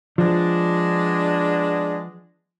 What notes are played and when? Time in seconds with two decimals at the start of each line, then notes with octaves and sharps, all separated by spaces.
0.18 F3 G#3 B3 D4